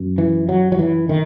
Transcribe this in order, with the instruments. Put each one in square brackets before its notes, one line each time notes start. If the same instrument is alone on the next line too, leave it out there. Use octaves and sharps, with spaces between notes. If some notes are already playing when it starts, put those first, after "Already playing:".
Already playing: [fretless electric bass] F#2
E3
F#3
F#3
E3
D#3